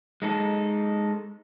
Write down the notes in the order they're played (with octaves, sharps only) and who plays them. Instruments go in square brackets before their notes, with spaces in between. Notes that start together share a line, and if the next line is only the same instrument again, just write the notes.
[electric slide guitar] G#3 D#4 A4